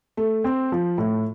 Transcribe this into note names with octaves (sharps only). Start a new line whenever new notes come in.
A3
C4
F3
A2